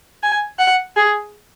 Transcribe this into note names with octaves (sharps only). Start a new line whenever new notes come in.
G#5
F#5
G#4